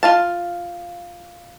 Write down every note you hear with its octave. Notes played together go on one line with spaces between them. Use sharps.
F4 F5 A5